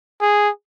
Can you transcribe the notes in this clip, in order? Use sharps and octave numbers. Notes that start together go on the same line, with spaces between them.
G#4